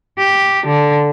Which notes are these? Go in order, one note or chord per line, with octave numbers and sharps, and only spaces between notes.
G4
D3